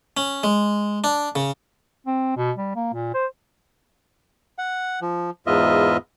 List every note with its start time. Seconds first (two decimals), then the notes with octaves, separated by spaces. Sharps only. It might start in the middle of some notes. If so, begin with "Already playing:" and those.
0.17 C#4
0.43 G#3
1.04 D4
1.36 C#3
2.07 C4
2.36 B2
2.58 G3
2.75 A#3
2.94 A#2
3.14 C5
4.59 F#5
5.02 F3
5.47 E2 G#2 B3 F4 D#5 E5